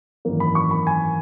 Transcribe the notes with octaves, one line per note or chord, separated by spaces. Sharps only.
G#1 F#2 E3 A#3
B5
C#6
B5
G#5